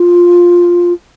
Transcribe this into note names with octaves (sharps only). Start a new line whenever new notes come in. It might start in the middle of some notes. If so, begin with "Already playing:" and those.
Already playing: F4